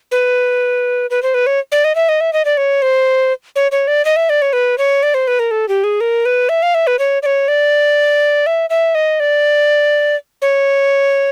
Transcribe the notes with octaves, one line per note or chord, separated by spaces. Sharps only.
B4
B4
C5
B4
C#5
D5
D#5
E5
D#5
E5
D#5
D5
C#5
C5
C#5
C#5
D5
D#5
E5
D5
C#5
B4
C#5
D5
C5
B4
A#4
A4
G4
G#4
A#4
B4
E5
F5
E5
B4
C#5
D5
C#5
D5
E5
E5
D#5
D5
C#5